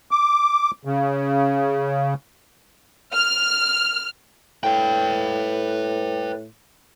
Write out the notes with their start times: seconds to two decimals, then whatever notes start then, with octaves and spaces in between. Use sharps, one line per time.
0.11 D6
0.85 C#3
3.13 F6
4.64 A2 B4 G5